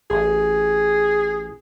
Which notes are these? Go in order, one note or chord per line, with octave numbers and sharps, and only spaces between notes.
A1 G#4